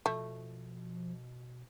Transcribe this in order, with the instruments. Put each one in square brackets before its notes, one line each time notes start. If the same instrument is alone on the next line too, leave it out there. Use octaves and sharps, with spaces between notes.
[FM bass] B2 [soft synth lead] F3 [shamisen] A3